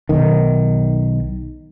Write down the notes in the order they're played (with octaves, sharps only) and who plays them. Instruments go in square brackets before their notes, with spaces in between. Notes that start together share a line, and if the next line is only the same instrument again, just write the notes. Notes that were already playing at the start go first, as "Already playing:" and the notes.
[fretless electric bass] B1 D#3